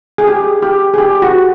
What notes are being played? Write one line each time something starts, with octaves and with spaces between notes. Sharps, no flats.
G#4
G4
G4
G#4
G4
F#4